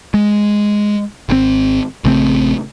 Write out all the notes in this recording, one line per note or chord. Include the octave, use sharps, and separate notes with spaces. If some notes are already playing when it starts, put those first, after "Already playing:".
G#3
G#1 C3 C4
A#1 C#3 A3 C4